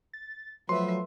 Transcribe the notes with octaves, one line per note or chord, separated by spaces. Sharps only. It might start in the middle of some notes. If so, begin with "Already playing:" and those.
A6
F3 F#3 A3 B4 E5 C6